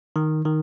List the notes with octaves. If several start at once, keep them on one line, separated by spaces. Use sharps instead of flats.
D#3
D#3